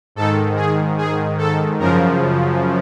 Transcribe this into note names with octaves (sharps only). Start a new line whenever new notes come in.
G#2 D#3 A4
G#4
G#4
A4
F#2 C#3 F3 A#4